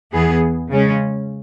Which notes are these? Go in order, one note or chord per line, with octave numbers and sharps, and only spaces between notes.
E2 E3 B3 G#4
C#3 G#3 C#4